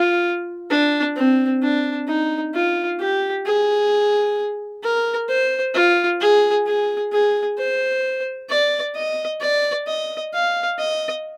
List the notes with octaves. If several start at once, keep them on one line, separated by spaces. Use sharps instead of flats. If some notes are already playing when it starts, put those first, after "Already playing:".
Already playing: F4
D4
C4
D4
D#4
F4
G4
G#4
A#4
C5
F4
G#4
G#4
G#4
C5
D5
D#5
D5
D#5
F5
D#5